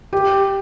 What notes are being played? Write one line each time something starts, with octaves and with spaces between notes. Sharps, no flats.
G4